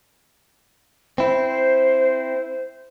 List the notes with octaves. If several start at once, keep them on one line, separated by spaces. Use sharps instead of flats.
C4 E4 C5